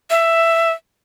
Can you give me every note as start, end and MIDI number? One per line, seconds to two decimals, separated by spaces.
0.10 0.72 76